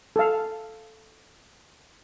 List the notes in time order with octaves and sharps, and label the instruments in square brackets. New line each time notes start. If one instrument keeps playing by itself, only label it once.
[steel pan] A4 F5